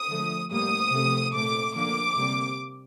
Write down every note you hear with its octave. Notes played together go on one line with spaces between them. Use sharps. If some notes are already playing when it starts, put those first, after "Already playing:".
Already playing: D#6
D3 F3 A3
A2 G3 A#3 D#6
C3 F3 A3
A#2 A3 D6
D3 F3 A#3 D6
C3 G3 A#3